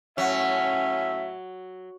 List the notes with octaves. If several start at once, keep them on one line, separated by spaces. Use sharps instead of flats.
A2 F#3 C#4 E5